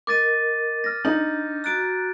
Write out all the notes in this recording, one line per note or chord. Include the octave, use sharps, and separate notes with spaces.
A#4 D#5 D6 A6 D#7
F6 A#6
D4 D#4 G6
F#4 A#5 F#6 A6 D7